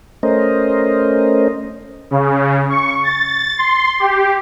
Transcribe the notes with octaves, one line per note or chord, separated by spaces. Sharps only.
A3 C#4 A#4 C5 D#5
C#3
C#6
A6
C6
G4